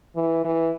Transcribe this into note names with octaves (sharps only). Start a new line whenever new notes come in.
E3
E3